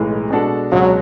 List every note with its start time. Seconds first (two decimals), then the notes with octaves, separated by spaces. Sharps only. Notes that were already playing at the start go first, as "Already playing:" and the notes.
Already playing: B1 A2 E3 G#3
0.31 B2 G#3 D4 F#4 A4
0.72 C#2 B2 F#3 G#3